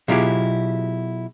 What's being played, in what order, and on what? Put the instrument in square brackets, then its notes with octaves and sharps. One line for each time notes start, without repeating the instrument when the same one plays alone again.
[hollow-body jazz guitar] B2 F#3 E4 F4 G4 G#4